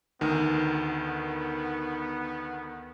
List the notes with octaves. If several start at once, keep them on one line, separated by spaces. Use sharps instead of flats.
D2 D#3 B3